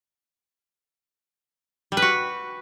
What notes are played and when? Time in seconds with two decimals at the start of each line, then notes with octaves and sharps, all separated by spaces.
1.92 G3
1.97 B4
2.02 F#4